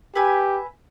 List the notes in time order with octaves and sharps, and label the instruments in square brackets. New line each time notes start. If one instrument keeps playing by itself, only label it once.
[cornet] G4 [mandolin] B4 E5 G#5